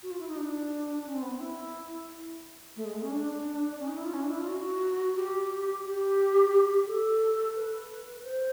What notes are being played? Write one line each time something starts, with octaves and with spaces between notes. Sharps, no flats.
F#4
F4
E4
D#4
D4
C#4
C4
B3
C4
E4
A3
G#3
A3
C#4
D4
C#4
D#4
E4
F4
C#4
D4
E4
F4
F#4
G4
G4
A4
B4
C5